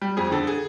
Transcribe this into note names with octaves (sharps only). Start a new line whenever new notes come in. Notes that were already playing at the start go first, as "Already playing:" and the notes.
G3
F2 G#4
D3 A4
G#4